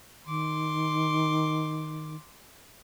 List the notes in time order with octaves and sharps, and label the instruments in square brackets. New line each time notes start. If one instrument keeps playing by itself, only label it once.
[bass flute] D#3 [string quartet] C6 D6